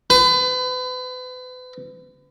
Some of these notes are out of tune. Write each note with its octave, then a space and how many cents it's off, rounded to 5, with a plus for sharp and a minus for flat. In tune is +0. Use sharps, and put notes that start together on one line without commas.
B4 +35